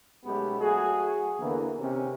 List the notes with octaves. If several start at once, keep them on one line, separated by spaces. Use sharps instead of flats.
B1 G#3 A3 B3 C#4 G4
F#3 A3 F#4 G#4
E2 D3 E3 A#3
C3 D#3 C#4